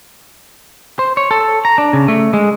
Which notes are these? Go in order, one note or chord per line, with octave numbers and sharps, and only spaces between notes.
C5
C#5
A4
A#5
D4
C#3
A3
G#3